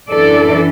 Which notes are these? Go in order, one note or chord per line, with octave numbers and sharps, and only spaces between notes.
F#2 E3 D4 A4 D5